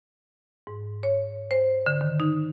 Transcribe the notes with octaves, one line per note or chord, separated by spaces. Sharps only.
G#2
C#5
C5
D3
D#3
D#4